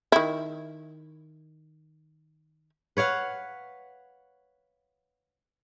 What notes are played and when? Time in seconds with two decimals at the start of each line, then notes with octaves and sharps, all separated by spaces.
0.12 D#3 E4
2.97 B4 C#5 F5 F#5